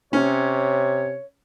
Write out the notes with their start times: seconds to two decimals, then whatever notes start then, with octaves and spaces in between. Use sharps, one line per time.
0.13 C3 C#4 C#5